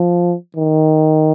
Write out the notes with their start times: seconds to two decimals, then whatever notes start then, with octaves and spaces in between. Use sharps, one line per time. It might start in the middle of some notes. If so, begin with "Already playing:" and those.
Already playing: F3
0.57 D#3